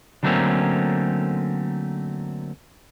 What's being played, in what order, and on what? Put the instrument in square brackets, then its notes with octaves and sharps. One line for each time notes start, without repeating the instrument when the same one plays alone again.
[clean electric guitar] D3 F#3 A3 A#3 C4 C#4